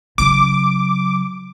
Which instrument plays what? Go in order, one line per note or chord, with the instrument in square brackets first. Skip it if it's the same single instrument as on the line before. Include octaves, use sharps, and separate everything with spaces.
[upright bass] C#3 F#3 [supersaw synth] D6